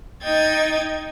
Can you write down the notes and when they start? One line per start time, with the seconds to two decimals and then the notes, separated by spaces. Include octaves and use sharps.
0.23 D#4 D#5 G5 G#6 A6